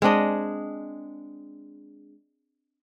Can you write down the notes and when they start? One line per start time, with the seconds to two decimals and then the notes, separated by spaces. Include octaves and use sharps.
0.02 G#3 C4 D4 D#5